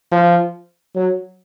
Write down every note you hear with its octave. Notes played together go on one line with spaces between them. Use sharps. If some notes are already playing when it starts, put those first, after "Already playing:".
F3
F#3